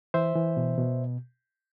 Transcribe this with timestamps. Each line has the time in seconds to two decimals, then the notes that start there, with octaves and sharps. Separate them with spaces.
0.14 E3 C5 E5
0.35 E3
0.57 B2
0.78 B2